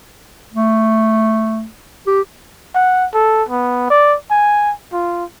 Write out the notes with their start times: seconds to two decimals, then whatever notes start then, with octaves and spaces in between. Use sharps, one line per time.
0.53 A3
2.07 G4
2.75 F#5
3.14 A4
3.49 B3
3.90 D5
4.31 G#5
4.93 F4